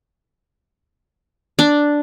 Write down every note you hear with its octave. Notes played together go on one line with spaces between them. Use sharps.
D4